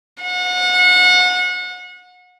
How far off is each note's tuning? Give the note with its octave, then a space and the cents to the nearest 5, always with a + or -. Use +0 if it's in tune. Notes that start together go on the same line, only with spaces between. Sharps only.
F#5 -30